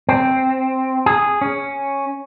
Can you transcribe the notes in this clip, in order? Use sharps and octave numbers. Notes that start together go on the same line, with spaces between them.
C4
G#4
C#4